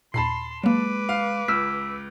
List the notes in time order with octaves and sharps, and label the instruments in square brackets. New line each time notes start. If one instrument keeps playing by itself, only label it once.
[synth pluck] D#2 A#2 [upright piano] A5 B5 C7 [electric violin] C6
[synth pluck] F#3 A#3 [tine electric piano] G#3 [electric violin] B4 D6
[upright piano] F5
[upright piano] C#2 [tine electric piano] E6 B6 [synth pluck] F6